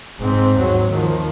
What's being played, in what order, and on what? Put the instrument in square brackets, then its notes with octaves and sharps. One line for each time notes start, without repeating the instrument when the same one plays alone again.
[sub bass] F1 [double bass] G#2 C4
[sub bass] D#2 [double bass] G#2 F#3
[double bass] D#3 F3